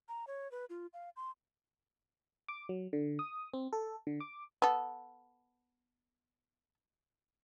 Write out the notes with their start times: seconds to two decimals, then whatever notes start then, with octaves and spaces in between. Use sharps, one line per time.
0.09 A#5
0.27 C#5
0.51 B4
0.70 F4
0.93 F5
1.16 C6
2.48 D6
2.69 F#3
2.93 D3
3.19 D#6
3.54 C4
3.73 A4
4.07 D3
4.20 D6
4.62 B3 A4